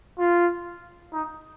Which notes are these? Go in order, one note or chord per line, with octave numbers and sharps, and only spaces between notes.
F4
D#4